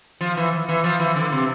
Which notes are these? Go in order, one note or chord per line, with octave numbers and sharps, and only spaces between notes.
F3
E3
E3
F3
E3
D3
C3